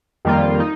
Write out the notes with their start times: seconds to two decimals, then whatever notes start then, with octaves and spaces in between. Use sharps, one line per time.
0.25 F2 D#3 G3 A#3 F4
0.60 D#4